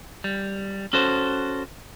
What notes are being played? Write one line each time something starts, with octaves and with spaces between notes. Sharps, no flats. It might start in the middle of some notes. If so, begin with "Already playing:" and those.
G3
C#4 F#4 A4 C5